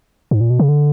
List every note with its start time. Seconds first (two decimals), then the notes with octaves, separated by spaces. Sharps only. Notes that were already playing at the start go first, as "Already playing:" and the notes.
0.31 G#2
0.41 A#2
0.50 B2
0.59 C#3
0.69 D3